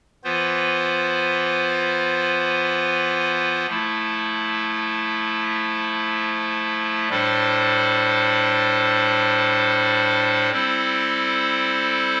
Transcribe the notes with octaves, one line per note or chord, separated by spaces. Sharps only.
E3 B3 F4 C5
F3 A3 E4
A2 G3 D4 A4 C5
G3 C4 E4 A4 C5